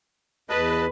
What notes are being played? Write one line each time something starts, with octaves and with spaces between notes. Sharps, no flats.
E2 B4 D#5 A5